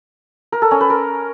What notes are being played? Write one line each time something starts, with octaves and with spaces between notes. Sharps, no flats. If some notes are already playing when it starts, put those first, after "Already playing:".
A#4
A4
C#4
B4
A#4